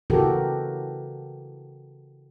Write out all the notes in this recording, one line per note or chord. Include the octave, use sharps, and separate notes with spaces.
C#3 E3 F#4 G4 A4 A#4